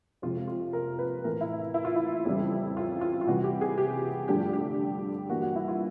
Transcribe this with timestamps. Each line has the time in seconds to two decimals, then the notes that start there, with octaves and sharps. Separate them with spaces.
0.22 F2 C3 F3 G#3 F4
0.48 F4
0.73 A#4
0.99 B4
1.24 A2 E3 A3 A#4
1.41 E4
1.74 E4
1.85 F4
1.96 E4
2.25 F2 C#3 E3 G3
2.77 F4
3.01 F4
3.21 F4
3.27 C3 E3 G3 F#4
3.44 G4
3.61 G#4
3.78 G4
4.28 G2 D3 F3 A3 G4
4.53 G4
5.30 G2 E3 G3 A#3 F#4
5.42 F#4
5.56 E4
5.68 F4